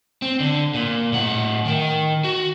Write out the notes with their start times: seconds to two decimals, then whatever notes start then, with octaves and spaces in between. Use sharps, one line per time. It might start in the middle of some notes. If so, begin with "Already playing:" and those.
0.22 C4
0.40 D3
0.74 A#2
1.13 A2 F#5
1.66 D#3 A#4
2.24 F#4